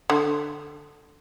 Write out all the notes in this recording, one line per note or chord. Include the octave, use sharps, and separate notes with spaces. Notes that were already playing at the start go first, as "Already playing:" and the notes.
D3